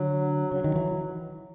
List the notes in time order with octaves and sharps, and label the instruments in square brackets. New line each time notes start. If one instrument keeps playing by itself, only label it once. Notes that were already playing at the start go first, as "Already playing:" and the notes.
Already playing: [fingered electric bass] D3 [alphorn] F#3
[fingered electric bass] C#3 [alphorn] F#3
[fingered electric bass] D#3
E3